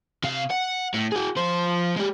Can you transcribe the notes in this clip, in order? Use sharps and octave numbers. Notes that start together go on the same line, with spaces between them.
C3 F5
F#5
A2
F#4 G#4
F3 C5
G#3 G4